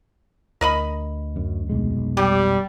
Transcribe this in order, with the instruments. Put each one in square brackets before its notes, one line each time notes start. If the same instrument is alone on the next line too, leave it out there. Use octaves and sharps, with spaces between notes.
[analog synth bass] D2 [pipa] A#4 D#5 B5
[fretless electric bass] F#2
F1 B1 G#3
[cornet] G3 [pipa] G4